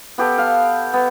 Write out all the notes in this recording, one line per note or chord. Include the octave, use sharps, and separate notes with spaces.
B3 G4 A4
F5
B3